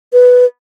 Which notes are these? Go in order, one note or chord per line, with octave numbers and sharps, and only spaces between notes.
B4